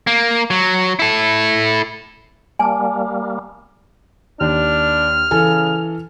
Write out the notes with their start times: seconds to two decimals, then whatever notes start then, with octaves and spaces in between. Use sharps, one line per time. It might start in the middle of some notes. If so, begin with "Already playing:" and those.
0.07 A#3
0.50 F#3
0.99 E4 A4
2.59 G3 A#3 G#5 A5
4.41 D#2 D4 F6
5.31 C#3 E3 A4 G#5